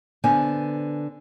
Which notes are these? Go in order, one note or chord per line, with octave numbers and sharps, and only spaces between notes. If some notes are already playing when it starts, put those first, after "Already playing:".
D3 B3 C5 G#5